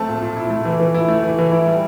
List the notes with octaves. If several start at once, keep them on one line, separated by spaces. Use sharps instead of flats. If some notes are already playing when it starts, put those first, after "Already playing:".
Already playing: A3 C4 A5
A#2
A#2
E4
A3
E3
E3
E4
A3
E3
E3
E4
G3